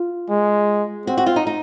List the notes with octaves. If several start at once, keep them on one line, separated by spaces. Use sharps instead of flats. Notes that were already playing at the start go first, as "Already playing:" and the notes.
Already playing: F4
G#3
C4 F#4
F#4
F4
D#4
D#4